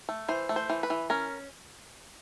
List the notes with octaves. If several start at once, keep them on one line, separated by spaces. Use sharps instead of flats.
A3
E3 C5
A3
C5
E3
B4
E3
C#4 A#4